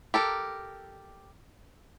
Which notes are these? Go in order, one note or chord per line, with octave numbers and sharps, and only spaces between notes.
G4 A4 A#4